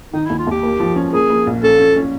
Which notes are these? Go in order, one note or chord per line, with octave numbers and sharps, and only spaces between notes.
D#3 D#4
E4
D#2
F4
D#2 G4
A#3
F3
C#4
A#3 G#4
A#3
A#1
C#4 A4
C#4
C#4